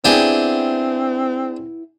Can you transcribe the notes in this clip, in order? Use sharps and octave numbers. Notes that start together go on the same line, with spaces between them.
B3 C4 D4 E4 G4 G#4 F#5